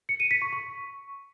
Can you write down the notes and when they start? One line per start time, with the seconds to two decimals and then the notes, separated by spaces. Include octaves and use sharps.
0.09 C#7
0.20 D#7
0.31 B6
0.42 C#6
0.53 C#6